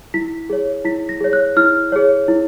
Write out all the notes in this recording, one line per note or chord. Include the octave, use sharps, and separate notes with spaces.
E4 B6
G#4 C#5
E4 B6
A#6
G#4 C#5
F#6
E4 F6
G#4 C#5
E4